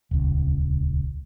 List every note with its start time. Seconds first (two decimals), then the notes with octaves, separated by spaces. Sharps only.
0.11 D#1 C#2